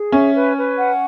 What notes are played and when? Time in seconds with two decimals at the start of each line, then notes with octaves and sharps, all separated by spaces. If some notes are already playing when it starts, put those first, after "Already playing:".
Already playing: G#4
0.12 C#4 E5
0.34 B4
0.56 B4
0.78 F#5